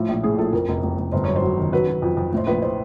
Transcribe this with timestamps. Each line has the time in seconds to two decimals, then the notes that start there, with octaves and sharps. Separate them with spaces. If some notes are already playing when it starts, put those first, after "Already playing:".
Already playing: A2 F3
0.08 A#1
0.23 A2 G#4
0.38 A#1 A4
0.52 F2 A#4
0.68 F1
0.83 F1
0.98 F1
1.12 G1 C5
1.24 F#2 C#5
1.36 C5
1.42 F#3
1.57 D#3
1.73 F#3 B4
1.88 F#3
2.02 F2
2.17 F2
2.33 A2 C5
2.47 A#1 B4
2.62 C5